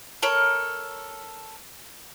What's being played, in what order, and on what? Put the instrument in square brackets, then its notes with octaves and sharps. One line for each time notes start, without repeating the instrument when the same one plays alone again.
[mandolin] A4 A#4 C#5